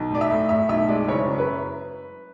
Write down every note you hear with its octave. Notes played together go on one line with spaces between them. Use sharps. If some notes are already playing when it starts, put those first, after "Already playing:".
Already playing: B1
A2 D5
E5
A2
A2 E5
B1 E5
G#3 D5
F#1 C#5
F#2
B4